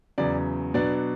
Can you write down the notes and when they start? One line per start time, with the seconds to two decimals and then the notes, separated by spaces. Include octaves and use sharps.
0.18 E2 C#3 F#3 D5
0.74 B2 F#3 B3 D4 D5